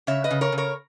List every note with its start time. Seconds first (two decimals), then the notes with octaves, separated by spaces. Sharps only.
0.07 C#3 C#5 E5
0.24 B4 D#5
0.31 C#3
0.41 A#4 C#5
0.52 C#3
0.58 A#4 C#5